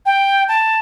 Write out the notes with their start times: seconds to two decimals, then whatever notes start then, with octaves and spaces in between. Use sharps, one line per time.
0.06 G5
0.48 A5